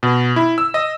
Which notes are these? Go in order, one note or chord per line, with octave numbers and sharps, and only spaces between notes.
B2
E4
E6
D#5